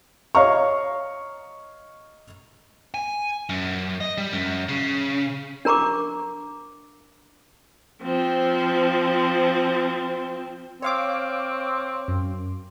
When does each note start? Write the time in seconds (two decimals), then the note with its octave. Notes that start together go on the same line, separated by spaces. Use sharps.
0.35 C#5 D#5 F5 A#5 C#6
2.94 G#5
3.49 F#2
4.01 D#5
4.18 G3
4.33 F#2
4.69 C#3
5.65 D4 A#4 A#5 C#6 D6
8.02 F3 C4
10.82 C4 C#5 F5 D6
12.08 F#2